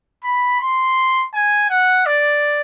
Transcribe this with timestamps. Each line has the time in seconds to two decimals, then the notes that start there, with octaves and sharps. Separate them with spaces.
0.24 B5
0.60 C6
1.34 G#5
1.70 F#5
2.06 D5